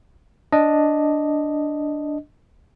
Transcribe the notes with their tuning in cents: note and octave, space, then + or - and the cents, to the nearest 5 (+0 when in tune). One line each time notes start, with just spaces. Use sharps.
D4 +0 D#5 +0